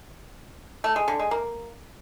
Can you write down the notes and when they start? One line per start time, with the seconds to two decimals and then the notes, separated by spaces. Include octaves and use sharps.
0.84 A3
0.96 G#3
1.08 D3
1.19 G#3
1.31 A#3